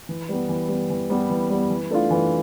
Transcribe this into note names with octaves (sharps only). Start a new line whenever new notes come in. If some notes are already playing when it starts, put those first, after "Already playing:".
E3
G3 B3
E3
G3 B3
E3
G3 B3
E3
G3 B3
E3
A3 D4 F4
E3